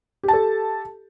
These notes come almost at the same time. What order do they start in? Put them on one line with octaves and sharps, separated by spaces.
G4 A5 A4